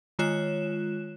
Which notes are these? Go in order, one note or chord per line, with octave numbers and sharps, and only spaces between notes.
D#3 G#3 F4 C#5 F#6 E7